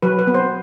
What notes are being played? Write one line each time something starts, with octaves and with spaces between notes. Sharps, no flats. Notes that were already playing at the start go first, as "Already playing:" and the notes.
F#3 B4
B4
B3
C5